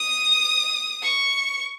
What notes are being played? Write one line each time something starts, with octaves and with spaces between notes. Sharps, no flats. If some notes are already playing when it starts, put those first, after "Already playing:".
Already playing: D#6
C#6